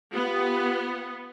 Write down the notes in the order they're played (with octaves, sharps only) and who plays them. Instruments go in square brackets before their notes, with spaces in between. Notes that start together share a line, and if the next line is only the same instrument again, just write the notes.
[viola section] B3 [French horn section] F4 G4